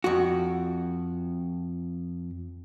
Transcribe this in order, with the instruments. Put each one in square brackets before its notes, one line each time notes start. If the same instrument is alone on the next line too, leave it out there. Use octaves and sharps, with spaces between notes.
[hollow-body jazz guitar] F2 F#4